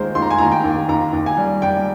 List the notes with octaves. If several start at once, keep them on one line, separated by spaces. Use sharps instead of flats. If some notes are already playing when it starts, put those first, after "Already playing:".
Already playing: D#2 D#3 G#3 A#4 C5
D#2 C6
A#5
G#5
D#2 A#5
G5
D#2
D#2 A#5
D#2
G#5
G3
G3 G5